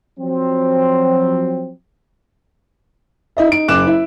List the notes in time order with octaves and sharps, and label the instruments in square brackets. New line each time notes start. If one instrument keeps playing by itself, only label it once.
[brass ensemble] F3 F#3 C4
[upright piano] E4 D#5 E5
D#4 D7
F#1 D6 F#6 E7
E4